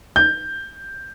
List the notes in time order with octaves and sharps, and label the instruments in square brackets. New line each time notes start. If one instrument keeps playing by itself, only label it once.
[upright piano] G6